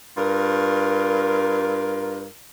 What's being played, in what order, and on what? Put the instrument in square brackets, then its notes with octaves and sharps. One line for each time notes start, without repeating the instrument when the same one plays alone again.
[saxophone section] G2 F4 A#4